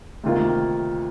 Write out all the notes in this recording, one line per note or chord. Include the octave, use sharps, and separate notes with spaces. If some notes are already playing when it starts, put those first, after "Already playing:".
D2 C3 D#3 A#3 F4